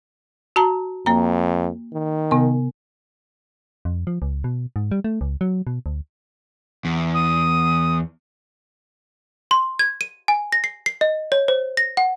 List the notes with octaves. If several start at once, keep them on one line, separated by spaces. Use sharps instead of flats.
F#4 A5 A#5
F2 A#3 A#5
D#3
C3 B3
F2
F3
C#2
B2
G#2
G3
A3
C#2
F#3
B2
D2
E2
D#6
C6
G#6
D#7
G#5
A#6
C7
C7
D#5
C#5
C5
A#6
F#5